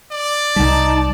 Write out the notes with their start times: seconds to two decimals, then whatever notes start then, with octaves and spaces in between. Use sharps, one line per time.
0.12 D5
0.56 C2 G3 D#4 A5